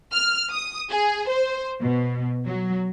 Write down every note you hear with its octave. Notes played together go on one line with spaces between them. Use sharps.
F6
D#6
G#4
C5
B2
F#3